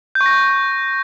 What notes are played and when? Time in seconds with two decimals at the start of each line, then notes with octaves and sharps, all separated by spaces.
0.15 G6
0.21 C#6
0.26 A#6
0.31 G6